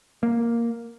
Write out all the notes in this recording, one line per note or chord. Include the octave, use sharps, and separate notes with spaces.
A#3